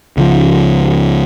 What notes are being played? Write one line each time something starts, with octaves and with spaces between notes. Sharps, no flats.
C#2 C#3 F3